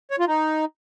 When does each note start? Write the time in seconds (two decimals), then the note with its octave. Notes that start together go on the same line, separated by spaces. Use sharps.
0.11 C#5
0.19 F4
0.28 D#4